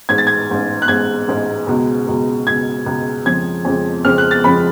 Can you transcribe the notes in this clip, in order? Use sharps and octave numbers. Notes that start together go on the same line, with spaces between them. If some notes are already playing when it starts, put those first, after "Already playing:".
A1 G#2 G#3 G#6
A6
G#6
A1 G#2 G#3
F#6
A1 G#2 G#3 G#6
A1 G#2 G#3
C#2 B2 G#3
C#2 B2 G#3
C#2 B2 G#3 G#6
C#2 B2 G#3
F2 C#3 F3 G#3 G#6
F2 C#3 F3 G#3
F2 C#3 F3 G#3 F6
F#6
A6
F2 C#3 F3 G#3 B5